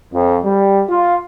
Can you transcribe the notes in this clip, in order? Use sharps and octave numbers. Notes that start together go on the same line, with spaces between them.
F2
G3
F4